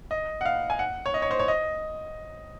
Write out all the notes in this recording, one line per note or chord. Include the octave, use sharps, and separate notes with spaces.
D#5
F#5
F5
G#5
F#5
C#5
D#5
C#5
C5
C#5
D#5